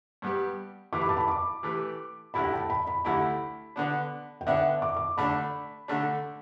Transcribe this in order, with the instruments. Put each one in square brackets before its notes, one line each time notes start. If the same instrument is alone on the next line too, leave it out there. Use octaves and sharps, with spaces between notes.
[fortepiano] G2 G3 B3 G4
[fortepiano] E3 A3 G4 B4 [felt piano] D6
[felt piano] B5
A5
B5
D6
[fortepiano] E3 A3 G4 B4
[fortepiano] D2 D3 A3 E4 G4 [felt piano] B5
[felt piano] G5
A5
B5
B5
[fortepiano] D2 D3 A3 E4 G4 [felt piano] B5
[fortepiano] D3 B3 D4
[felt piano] G5
[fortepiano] D3 B3 D4 [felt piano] E5
[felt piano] D6
D6
[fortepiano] D3 A3 D4 [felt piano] B5
[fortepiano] D3 A3 D4